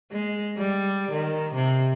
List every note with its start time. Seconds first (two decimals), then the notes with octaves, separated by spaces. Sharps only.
0.12 G#3
0.57 G3
1.11 D#3
1.55 C3